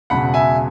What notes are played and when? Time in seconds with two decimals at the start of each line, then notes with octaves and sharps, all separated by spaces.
0.10 E1 E2 C#3 F#3 F#5 B5
0.34 E5 G#5